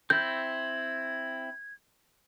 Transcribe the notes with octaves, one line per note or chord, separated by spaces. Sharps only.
C4 E4 G6 G#6